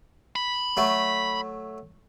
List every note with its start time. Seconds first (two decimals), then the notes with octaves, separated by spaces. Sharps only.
0.36 B5
0.77 F#3 A3